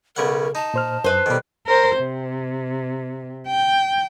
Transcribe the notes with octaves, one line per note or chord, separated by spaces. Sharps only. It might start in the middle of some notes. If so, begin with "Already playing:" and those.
B1 C#3 A#4 F#5
D#4 A5
A#2 C5 F6
F#2 B4 C5
B2 D#3 G3 A4
A#4 C5
C3
G5